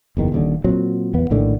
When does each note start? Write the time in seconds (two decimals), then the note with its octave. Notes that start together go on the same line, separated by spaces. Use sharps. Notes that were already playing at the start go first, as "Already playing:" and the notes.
0.17 F#1 E2 D#3
0.32 D#1 D#2 D3
0.64 A#2 F#3 C4
1.14 E2 B3
1.30 A#1 A2 D3 D#3